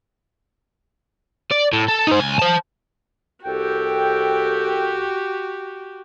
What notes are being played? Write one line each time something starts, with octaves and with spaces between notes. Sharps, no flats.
D5
A2
A4
D#4 C5
C#2 G#5
C5 A5
C2 F#4 G4 A4 G5